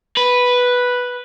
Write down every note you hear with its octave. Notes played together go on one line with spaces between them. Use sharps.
B4